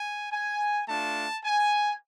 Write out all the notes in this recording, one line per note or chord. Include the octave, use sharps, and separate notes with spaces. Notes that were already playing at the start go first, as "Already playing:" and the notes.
Already playing: G#5
G#5
A3 D4 F4 A5
G#5